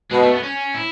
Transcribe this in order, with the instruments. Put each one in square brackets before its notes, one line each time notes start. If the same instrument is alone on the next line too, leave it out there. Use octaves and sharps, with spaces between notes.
[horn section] B2 [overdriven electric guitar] G#3
[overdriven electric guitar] A3
B3
C#4
E4